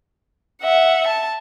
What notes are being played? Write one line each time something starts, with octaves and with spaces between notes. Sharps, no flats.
E5 F#5
A5